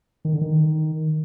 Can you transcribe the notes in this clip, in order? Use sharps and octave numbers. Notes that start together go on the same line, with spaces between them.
D#3
D3
D#3